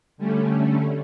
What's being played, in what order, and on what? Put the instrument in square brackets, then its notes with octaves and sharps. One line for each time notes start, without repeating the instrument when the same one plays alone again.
[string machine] D3 G3 A3 C#4